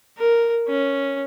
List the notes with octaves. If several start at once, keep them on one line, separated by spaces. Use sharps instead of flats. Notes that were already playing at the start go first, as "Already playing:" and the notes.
A#4
C#4